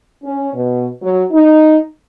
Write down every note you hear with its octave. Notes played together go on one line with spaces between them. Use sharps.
C#4
B2
F#3
D#4